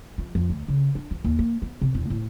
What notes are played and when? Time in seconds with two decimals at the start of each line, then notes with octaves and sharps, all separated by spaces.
0.18 F3
0.35 F2
0.49 D2
0.68 C#3
0.95 D4
1.11 F3
1.24 D#2
1.39 A#3
1.62 B3
1.82 C3
1.95 E1
2.10 A2